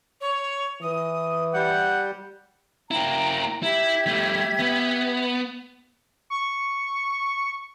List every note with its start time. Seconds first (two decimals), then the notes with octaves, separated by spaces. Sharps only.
0.21 C#5
0.82 E3 D#6
1.54 G3 F#5 G6
2.91 A#3 E4 G5 A#5
3.63 E4 G4 E5 G#6
4.07 G3 A3
4.60 B3
6.30 C#6